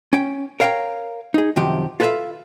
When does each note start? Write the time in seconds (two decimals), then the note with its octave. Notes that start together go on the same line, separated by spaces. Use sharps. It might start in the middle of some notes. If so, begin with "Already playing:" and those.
0.13 C#4 G5
0.60 A#4 C#5 F5 G5 G#5 A#5
1.34 D#4 G#4
1.56 F#2 C3 D#3 F3 G4
2.00 F4 A4 B4 C#5 E5 F5